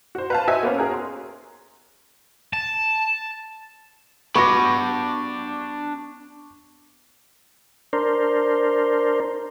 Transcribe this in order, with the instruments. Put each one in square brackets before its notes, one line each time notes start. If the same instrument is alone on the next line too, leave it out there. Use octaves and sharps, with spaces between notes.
[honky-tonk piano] F#4 C5
B4 F5 A5
F#4 C5 D#5 E5 G#5
A#3 B3 C#4
F#4 G#4 A#4
C6
[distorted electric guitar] A5
[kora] B3 F#4 [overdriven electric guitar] D4 B5 [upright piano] C#6 D6 A#6
[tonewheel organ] D4 A#4 C5